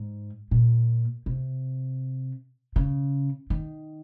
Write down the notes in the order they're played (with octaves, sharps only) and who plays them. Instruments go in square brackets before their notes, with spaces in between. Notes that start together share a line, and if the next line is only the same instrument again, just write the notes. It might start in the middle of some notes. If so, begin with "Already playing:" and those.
Already playing: [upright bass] G#2
A#2
C3
C#3
D#3